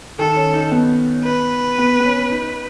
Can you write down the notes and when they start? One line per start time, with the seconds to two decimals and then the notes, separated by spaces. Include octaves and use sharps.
0.19 D#3 A4
0.36 C#4
0.54 D#4
0.71 B3
1.24 B4
1.78 B3
2.00 B3
2.05 C#4
2.30 D#4